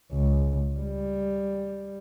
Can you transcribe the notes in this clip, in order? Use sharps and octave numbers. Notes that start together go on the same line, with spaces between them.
C#2
G3